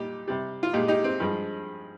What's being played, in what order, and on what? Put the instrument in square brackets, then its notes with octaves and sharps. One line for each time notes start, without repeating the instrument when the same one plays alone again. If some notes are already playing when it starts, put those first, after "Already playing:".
Already playing: [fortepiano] A#2 G3 D#4 G4
C3 G3
F4
A#2 G#3 D#4 G4
D#4 G4
C4
G2 F3 G#3